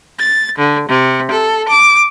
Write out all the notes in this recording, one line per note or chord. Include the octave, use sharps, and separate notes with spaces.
A6
D3
C3
A4
D6